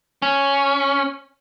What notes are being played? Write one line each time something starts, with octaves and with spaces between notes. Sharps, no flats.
C#4